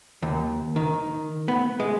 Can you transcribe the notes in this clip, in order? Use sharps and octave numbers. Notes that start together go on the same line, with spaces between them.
D#2
D#3
B3
G#3